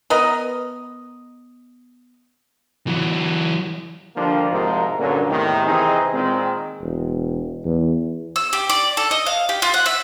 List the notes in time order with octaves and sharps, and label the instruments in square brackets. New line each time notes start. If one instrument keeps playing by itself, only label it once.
[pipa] B3 A#4 D#5
[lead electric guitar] E3 F#3
[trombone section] D3 D#3 F3 G3 A#3 D4
G#1 G#2 C3 F3 D#4 A#4
G2 A#2 D3 F#3 A#3 C#4
E2 A2 C3 D#3
C3 D#3 E3 C4 D#4 G#4
A#2 D#3 G#3 C4
[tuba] E1
E2
[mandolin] E6
G4
D5
A4
D#5
F5
G4
F4
F#5
E5